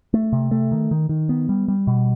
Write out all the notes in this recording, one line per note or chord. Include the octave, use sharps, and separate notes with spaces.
A3
C3
A3
D#3
D#3
D#3
B3
G3
G3
B2